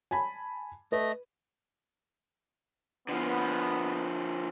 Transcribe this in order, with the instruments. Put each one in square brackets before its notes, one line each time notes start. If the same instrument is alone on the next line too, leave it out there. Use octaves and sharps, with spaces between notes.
[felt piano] G#5 A5 B5
[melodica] A3 D#5 [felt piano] B4
[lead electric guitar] D3 F3 [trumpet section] B3